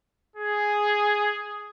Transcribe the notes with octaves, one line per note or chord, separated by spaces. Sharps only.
G#4